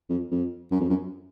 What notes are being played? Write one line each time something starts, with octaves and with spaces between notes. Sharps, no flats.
F2
F2
F#2
F2
F#2